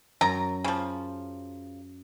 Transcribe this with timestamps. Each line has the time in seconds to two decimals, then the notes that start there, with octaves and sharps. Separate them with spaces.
0.21 F#2 A#5
0.64 C#3 F3